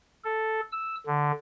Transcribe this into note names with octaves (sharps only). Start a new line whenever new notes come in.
A4
E6
D3